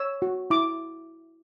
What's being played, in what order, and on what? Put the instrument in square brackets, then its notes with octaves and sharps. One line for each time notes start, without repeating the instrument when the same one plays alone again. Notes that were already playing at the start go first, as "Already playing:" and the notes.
Already playing: [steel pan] C#5 E6
F#4
E4 D6